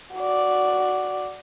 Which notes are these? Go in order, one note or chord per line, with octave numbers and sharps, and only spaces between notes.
F#4 D5